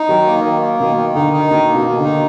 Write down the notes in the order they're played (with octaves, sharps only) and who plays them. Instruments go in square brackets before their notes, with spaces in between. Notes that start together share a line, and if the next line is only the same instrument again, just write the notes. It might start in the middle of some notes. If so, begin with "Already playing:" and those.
Already playing: [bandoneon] D#4
[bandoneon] D#3 [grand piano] F#3
[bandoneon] A#3
D#3
A#3
[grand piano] B2 [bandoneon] D#3
[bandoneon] D#3
[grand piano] D3 [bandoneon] D#4
[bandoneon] D#4
[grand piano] B2 [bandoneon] D#3
[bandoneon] A#3
[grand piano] B2
[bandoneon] D#3
[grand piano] D3
[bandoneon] D#4